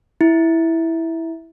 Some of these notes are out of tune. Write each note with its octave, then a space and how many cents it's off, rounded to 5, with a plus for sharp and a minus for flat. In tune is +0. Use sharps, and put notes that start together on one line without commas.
E4 -5